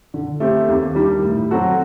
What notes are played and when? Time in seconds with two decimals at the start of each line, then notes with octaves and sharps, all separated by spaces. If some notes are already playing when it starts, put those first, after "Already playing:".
0.14 D3
0.40 A3 C4 G4
0.68 D#2
0.95 D#3 G3 D4
1.23 A2
1.50 F#3 C4 F#4 A4